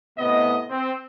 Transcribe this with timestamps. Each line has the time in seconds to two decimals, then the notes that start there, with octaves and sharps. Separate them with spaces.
0.18 A2 C3 B3 D#5
0.69 C4